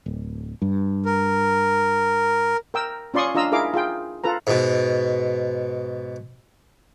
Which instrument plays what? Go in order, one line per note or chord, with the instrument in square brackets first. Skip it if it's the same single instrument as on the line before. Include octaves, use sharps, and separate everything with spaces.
[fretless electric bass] D1
G2
[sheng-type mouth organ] A#4
[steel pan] A#4 G5 E6
C#4 F4 D5 C6 C#6 D#6
D4 F4 D#5 A#5 E6
D#4 E4 G#4 A#4 F5 D6
F4 G#4 G5
F4 A4 B4 A#5
[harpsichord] G#2 B2